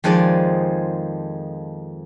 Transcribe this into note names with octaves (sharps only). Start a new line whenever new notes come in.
F2 D#3 F3 G#3 G#4 D5